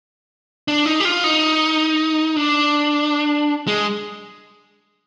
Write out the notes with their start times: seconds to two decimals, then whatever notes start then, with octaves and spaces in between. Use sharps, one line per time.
0.68 D4
0.86 D#4
1.00 G4
1.05 F4
1.24 D#4
2.36 D4
3.67 G#3